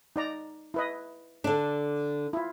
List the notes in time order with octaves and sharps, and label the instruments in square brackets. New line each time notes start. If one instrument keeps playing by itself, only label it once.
[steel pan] D#4 D5 A#5
E4 B4 D#5
[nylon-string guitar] D3 D4
[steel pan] E4 F4